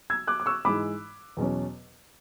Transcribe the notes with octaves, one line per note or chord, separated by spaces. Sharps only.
E6 G#6
D6 F#6
D6
C#6 E6
G#2 E3 G#3 B5 D6
E2 B2 F#3 C#4